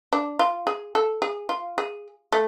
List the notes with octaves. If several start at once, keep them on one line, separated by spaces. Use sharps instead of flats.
D4
F4
G#4
A4
G#4
F4
G#4
A3